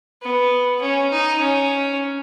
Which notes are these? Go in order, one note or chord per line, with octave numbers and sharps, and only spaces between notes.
B3
C#4
D#4
C#4